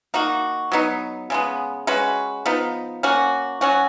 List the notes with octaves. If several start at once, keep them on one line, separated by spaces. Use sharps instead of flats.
A#3 D#4 F#4
F#3 B3 D#4
C#3 G#3 B3
G#3 C#4 F#4 B4
F3 B3 D#4
A#3 C#4 F#4
F#3 C#4 F#4